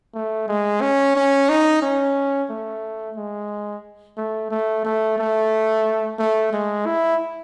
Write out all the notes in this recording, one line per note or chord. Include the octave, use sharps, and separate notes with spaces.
A3
G#3
C#4
C#4
D#4
C#4
A3
G#3
A3
A3
A3
A3
A3
G#3
E4